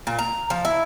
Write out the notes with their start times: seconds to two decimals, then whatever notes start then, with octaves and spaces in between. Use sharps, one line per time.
0.07 A#2
0.19 A#5
0.50 F3
0.65 E4